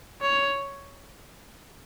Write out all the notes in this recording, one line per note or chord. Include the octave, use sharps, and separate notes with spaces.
C#5